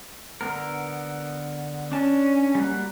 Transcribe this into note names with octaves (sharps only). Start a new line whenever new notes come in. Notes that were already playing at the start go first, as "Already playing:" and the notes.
D3 B3 A#4
C#4 D4 A5
G3 A#3 F#4